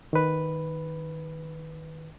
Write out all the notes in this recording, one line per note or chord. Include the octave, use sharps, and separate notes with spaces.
D#3 B4